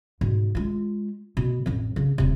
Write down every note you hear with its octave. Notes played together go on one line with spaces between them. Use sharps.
G#2 B2
G#3 F4
B2
A1 F2
C#3 C4
D#1 C3